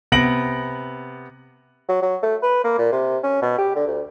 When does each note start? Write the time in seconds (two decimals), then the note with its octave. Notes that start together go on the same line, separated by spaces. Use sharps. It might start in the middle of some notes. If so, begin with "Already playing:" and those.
0.12 C3 B3 A#6 D7 F#7
1.89 F#3
2.02 F#3
2.23 A3
2.43 B4
2.64 A#3
2.79 A#2
2.92 C3
3.23 C#4
3.42 B2
3.58 G4
3.76 D3
3.87 D2